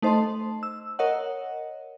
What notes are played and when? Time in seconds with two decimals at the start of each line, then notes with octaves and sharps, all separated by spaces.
0.02 A3 D#4 C5 D#5 A5 C6
0.63 E6
0.99 A#4 C#5 D#5 F#5